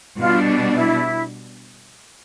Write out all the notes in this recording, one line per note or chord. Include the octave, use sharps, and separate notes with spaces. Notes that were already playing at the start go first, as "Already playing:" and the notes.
B2 G3 B3 D4 F4
E4